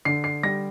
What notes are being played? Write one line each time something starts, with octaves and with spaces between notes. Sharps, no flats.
D3 C7
C7
G3 A#6